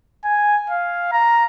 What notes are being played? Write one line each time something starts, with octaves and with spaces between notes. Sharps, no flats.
G#5
F5
A#5